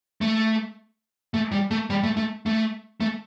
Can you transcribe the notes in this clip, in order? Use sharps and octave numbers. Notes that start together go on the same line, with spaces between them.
A3
A3
G3
A3
G3
A3
A3
A3
A3